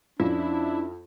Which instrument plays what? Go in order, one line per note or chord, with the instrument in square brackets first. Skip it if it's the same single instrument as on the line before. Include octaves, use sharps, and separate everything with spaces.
[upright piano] F2 [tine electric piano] C#4 [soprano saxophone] D4 [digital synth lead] E4